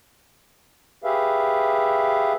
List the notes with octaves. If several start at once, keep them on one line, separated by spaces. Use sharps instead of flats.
G4 G#4 B4 E5 F5